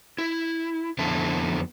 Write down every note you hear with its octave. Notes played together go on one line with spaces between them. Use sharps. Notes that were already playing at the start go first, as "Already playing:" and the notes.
E4
F2 D3 B3 E4 A5